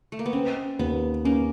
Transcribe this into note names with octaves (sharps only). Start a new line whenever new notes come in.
A3
A#3
B3
C4 C#4
D#2 B3
A#3 C#4